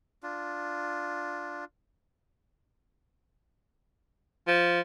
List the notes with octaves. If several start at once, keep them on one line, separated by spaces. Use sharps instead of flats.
D4 F4
F3